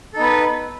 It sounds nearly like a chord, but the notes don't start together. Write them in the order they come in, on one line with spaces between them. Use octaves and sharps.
A4 D#4 B3 B4